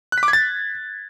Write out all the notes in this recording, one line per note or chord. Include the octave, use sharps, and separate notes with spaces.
F#6
B6
D6
G#6
A6